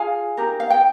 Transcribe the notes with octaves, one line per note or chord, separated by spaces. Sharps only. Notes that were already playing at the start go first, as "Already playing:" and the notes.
Already playing: F4 G#4 F5 G#5
D#4 G4 A#4
F5
G5